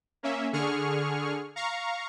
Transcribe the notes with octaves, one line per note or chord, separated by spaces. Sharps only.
A#3 C#4 E5
D3 G#4 C#6 F6
F5 A#5 C#6